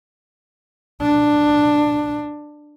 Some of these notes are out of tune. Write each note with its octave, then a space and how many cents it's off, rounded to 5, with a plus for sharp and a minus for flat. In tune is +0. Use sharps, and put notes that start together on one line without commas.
D4 +10